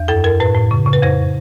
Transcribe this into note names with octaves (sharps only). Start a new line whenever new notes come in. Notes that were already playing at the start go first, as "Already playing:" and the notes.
Already playing: E2
F#2 A4
F#2 A#4
A2 B4
A2
C#3
C#3
B4
F2 C5